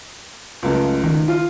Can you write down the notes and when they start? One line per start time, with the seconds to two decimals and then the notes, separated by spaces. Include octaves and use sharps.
0.63 C#2 F#2 A3
1.04 D#3
1.28 F4